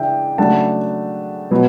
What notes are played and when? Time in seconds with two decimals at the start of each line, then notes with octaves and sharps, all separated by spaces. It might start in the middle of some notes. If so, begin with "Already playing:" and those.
Already playing: C#3 E3 D4 E5 G5
0.38 C#3 F#3 A3 D4 F#5 A5
1.51 B2 F#3 B3